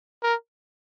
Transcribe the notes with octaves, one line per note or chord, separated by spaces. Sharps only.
A#4